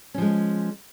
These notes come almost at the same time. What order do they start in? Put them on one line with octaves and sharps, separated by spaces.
C#4 F3 G#3